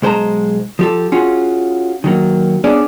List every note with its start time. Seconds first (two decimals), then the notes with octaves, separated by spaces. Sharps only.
0.02 B1 G#3 C5 A5 A#5
0.79 F3 G4 A4
1.12 C#4 F4 F#4 G#4
2.04 D#3 F#3 A#3
2.64 B3 C#4 D4 G#4 D5